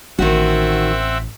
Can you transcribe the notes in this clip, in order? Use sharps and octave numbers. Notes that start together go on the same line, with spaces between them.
A1 A2 D#3 C4 F#4 E5 F#5